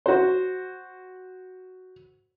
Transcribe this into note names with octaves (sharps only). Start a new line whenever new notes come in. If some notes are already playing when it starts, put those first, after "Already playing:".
F#4 C5